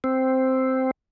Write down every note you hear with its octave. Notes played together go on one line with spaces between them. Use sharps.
C4